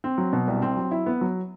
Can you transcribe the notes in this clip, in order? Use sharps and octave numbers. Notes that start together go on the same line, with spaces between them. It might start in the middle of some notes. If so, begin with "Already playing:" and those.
C4
F#3
B2
C2
C4
F#3
E4
B3
F#3